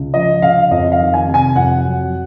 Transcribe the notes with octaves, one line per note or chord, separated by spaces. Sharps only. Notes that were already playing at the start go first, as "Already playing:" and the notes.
Already playing: C#2
F3 D#5
C#3 F5
F2 D#5
F5
D#3
G#5
C3
G#5
F2 F#5
F#3